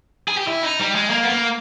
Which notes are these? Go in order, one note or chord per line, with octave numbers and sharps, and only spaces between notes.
G#4
G4
E4
D#4
G3
G#3
A#3
B3
A#3